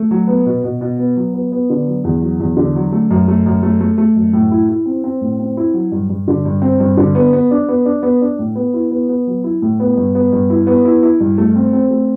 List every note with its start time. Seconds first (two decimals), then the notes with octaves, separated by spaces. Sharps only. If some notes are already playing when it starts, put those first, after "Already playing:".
Already playing: A3
0.11 F#3
0.28 B3
0.46 B2
0.64 B2
0.81 B2
0.99 B3
1.16 F#3
1.34 B3
1.52 B3
1.70 D3
1.87 F#3
2.04 E2
2.22 F#3
2.40 E2
2.57 D3
2.75 F#3
2.92 A3
3.10 F#2
3.28 A3
3.46 F#2
3.63 A3
3.80 A3
3.98 A3
4.16 F#2
4.33 A2
4.51 E4
4.69 E4
4.86 C4
5.04 C4
5.21 A2
5.40 C4
5.57 E4
5.74 F#3
5.92 G2
6.09 G2
6.28 D3
6.45 G2
6.62 C4
6.80 G2
6.97 D3
7.15 B3
7.33 B3
7.51 D4
7.68 B3
7.85 D4
8.03 B3
8.21 D4
8.39 A2
8.55 B3
8.74 E4
8.91 B3
9.09 B3
9.27 F#3
9.44 E4
9.62 A2
9.80 B3
9.97 G2
10.15 B3
10.32 G2
10.50 E4
10.67 B3
10.85 E4
11.03 E4
11.20 G2
11.38 A3
11.56 C4
11.73 C4
11.91 A3